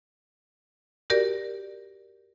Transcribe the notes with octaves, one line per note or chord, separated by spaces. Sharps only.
F#4 G4 A#4 D5